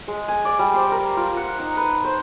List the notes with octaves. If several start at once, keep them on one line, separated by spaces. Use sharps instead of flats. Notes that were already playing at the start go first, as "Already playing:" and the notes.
G#3
G#5
D5
G3
C5
A#4
F4
F#5
D#4
B4
C5